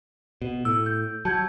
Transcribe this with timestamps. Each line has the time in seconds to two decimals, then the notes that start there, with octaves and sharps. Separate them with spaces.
0.42 B2
0.65 A2 E6
0.86 G6
1.25 F#3 A5 G6 G#6